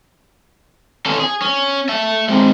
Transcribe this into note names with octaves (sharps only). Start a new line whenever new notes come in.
C#4 A4
G#4
C#4
E5 A5
G#3 C4